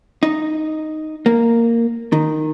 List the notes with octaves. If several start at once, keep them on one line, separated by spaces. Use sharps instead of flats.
D#4
A#3
D#3